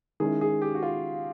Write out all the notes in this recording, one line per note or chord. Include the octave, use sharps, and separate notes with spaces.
D#3 G#3 C#4 E4 G#4
G#4
G4
F#4
F4